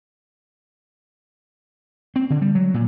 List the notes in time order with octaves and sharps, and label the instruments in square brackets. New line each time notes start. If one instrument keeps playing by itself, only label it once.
[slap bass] C4
D3
G3
F#3
A#2